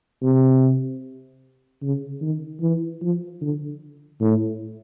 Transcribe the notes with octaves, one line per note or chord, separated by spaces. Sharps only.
C3
C#3
D#3
E3
F3
D3
A2